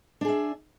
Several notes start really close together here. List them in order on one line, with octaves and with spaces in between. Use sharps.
D4 G#4 E5